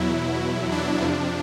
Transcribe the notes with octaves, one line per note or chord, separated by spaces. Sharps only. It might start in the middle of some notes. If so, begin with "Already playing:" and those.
Already playing: E2 B2 F#3 E4
D4
F2 C3 F3